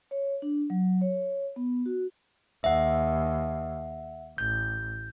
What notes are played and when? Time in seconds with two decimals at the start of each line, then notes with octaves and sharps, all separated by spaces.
0.11 C#5
0.42 D4
0.70 F#3
1.01 C#5
1.56 B3
1.86 F#4
2.64 D#2 E5 F#5
4.38 A1 G6